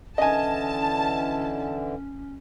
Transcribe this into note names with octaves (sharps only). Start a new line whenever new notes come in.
D3 E3 C#4 D#5 G#5 A5